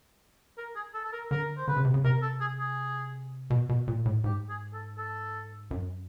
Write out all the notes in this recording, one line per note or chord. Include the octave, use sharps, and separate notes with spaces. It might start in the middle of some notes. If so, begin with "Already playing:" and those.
A#4
G#4
A4
A4
A#4
D3 A#4
C5
D3 B4
C#3
C3
C#3
C3 A#4
A4
G#4
G#4
B2
B2
A#2
A2
G#2 G4
G#4
A4
A4
F#2